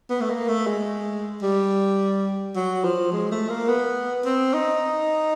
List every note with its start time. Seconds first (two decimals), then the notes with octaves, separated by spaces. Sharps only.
0.10 B3
0.21 A3
0.30 A#3
0.48 A3
0.67 G#3
1.42 G3
2.56 F#3
2.84 F3
3.12 G#3
3.31 A3
3.49 A#3
3.68 B3
4.25 C4
4.54 D#4